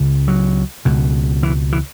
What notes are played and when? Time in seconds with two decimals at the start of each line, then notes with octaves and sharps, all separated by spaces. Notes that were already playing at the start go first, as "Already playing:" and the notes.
Already playing: C#2 C#3
0.28 F#3
0.85 C#2 B2
1.43 E3
1.72 E3